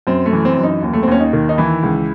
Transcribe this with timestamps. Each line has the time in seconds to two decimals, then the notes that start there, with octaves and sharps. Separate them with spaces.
0.07 F#2 C4
0.26 A3
0.33 E3
0.45 C4
0.57 F#2
0.64 D#4
0.83 D#2
0.93 A3
1.03 C4
1.08 D#2 C#4
1.20 D#4
1.33 D#3
1.49 D#4
1.58 E3 E4
1.83 C#2